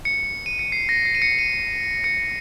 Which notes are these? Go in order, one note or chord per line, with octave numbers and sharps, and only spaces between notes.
C#7
D#7
C#7
C7
A#6
C7
D#7
C#7
D#7
C#7